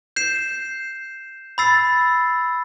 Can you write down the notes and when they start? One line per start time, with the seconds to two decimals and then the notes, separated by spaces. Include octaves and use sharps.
0.16 G6 C7 E7
1.58 B5 E6 A6 C7